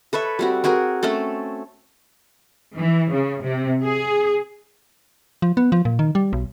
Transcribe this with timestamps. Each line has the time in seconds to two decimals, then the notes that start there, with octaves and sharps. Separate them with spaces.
0.13 A4 B4 C#5 E5
0.39 G3 C4 F#4
0.64 C4 F#4 G#4 A#4
1.03 A3 C4 C#4 A4
2.75 E3
3.11 C#3
3.42 C3
3.83 G#4
5.42 F3
5.57 B3
5.72 F3
5.85 A#2
5.99 D#3
6.15 G3
6.33 B1